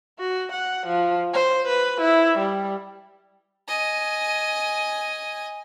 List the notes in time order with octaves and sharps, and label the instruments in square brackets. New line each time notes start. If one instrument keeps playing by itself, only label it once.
[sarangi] F#4
F#5
F3
C5
B4
E4
G3
[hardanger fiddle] D#5 G#5